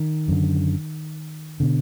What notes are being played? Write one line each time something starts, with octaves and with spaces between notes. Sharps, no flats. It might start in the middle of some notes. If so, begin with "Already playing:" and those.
Already playing: D#3
F#2 D3
B2 D3